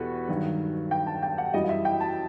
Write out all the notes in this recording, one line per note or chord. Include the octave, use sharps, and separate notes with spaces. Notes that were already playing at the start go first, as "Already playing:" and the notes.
Already playing: E2 B2 G3 F#4 A4 B4
G2 D#3 F#3
G5
A5
G5
F#5
F#2 E3 G3 D#5
D#5
E5
G5
A5